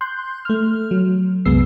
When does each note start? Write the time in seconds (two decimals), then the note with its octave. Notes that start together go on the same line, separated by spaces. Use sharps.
0.01 C6 F#6 G6
0.45 A3 F6
0.91 F#3
1.45 C2 F#2 G#3 B3 E6 C7